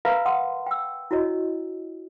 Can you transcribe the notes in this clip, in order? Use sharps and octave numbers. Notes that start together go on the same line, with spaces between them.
A#4 B4 E5 F5 A#5 B5
F#5 C6 D#6
G5 E6
E4 F#4 C#5 D#5